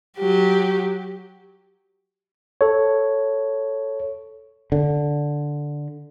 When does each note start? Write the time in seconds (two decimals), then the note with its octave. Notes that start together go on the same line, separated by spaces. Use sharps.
0.18 F#3 G4
2.61 A4 C#5
4.72 D3